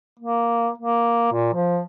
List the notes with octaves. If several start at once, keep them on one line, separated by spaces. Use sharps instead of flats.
A#3
A#3
A#2
F3